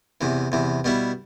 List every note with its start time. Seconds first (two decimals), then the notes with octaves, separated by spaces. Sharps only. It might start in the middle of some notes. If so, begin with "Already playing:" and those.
0.21 E2 C3 E3
0.52 E2 C3 E3
0.84 B2 G3 B3 E4